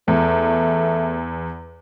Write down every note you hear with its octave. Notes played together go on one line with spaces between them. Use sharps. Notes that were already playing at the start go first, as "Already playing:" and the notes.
E2 A3